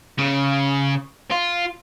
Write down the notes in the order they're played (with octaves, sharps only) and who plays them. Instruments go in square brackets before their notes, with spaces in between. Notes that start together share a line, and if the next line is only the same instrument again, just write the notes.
[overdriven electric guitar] C#3
F4